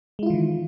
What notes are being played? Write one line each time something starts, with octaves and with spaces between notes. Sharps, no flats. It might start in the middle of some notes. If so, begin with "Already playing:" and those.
D#3 E3 G#3 E4 F4